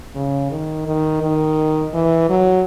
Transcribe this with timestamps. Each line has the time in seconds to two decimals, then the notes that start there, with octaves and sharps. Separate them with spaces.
0.15 C#3
0.51 D#3
0.87 D#3
1.22 D#3
1.94 E3
2.29 F#3